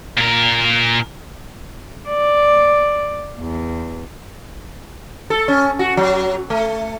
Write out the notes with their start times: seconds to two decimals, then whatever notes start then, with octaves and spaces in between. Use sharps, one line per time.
0.18 A#2 A#4
2.08 D5
3.39 E2
5.30 A4
5.48 C#4
5.79 F#4
5.97 F#3
6.50 A3